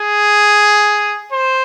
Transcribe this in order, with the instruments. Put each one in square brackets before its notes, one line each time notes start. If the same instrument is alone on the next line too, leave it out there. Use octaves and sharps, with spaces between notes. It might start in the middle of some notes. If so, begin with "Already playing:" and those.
Already playing: [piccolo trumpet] G#4
C5